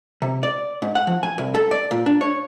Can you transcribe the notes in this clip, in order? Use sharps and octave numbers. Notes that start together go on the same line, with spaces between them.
C3
D5
G#2
F#5
F3
G#5
C2
A4
D5
A#2
D4
C#5